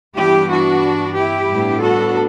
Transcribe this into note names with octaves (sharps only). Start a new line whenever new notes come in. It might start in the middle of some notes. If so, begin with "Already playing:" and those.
G2 E3 G3 B3 D4 E4 G4
D4 F#4
E4 G4
A2 G3 B3 D4
F#4 A4